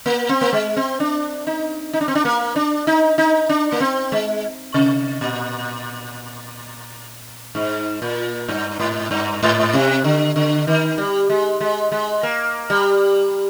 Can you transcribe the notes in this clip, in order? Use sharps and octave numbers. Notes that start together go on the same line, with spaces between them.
A#3
C4
A#3
G#3
C4
D4
D#4
D#4
D4
C4
D4
A#3
D4
D#4
D#4
D4
A#3
C4
G#3
C3
A#2
G#2
A#2
G2
G#2
G2
G#2
C3
D3
D3
D#3
G3
G#3
G#3
G#3
A#3
G3